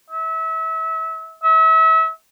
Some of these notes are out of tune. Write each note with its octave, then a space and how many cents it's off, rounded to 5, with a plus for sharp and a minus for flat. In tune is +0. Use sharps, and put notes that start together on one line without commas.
E5 -30
E5 -35